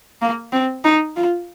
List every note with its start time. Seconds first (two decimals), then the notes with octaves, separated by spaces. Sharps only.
0.22 A#3
0.52 C4
0.84 D#4
1.16 F4